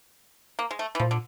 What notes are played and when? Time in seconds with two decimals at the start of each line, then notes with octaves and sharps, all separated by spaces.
0.59 A#3
0.71 G#3
0.79 A3
0.95 E3
1.00 A#2 F3
1.11 D3